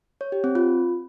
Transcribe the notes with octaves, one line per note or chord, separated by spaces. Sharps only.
C#5
G4
C4
F4